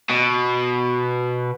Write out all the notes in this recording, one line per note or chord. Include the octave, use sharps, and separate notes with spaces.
B2